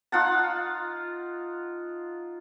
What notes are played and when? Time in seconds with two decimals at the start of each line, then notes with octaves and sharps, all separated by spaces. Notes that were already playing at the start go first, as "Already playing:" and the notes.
0.12 D#4 F4 F#5 A5